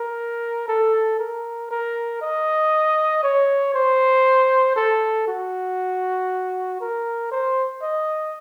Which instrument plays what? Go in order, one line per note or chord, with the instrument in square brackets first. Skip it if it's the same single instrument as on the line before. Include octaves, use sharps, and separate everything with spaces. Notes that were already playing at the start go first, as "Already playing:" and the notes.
Already playing: [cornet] A#4
A4
A#4
A#4
D#5
C#5
C5
A4
F#4
A#4
C5
D#5